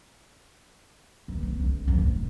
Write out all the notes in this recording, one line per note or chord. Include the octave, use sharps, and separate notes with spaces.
E2
B3
C#2
E2 F3
A2
F1